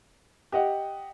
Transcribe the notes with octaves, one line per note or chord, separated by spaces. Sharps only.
G4 D#5 F#5